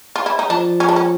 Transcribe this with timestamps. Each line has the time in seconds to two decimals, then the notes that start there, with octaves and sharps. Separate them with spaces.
0.16 F4
0.26 E4
0.39 D#4
0.50 F3 D4
0.80 C#4
0.88 D4
0.96 C#4